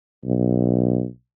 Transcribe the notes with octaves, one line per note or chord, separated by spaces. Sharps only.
B1